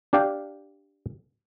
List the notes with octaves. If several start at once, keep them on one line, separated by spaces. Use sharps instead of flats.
D4 G4 D5 F5 G5